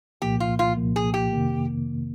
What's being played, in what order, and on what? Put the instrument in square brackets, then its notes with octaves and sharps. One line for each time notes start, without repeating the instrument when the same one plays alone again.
[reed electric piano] C2 A#2 F3 A#3 [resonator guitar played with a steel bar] G4
[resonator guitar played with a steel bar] F4
F4
[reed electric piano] C2 A#2 F3 A#3
[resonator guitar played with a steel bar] G#4
G4
[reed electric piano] F2 C3 D#3 A#3